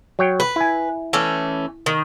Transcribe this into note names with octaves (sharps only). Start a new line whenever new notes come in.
F#3 C#5 G5
B4
E4 G#5
E3 A3 C#4
D#3